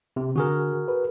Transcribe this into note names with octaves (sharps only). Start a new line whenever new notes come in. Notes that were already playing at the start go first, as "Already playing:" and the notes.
C3
D3 F#4 G#4 A#4
B4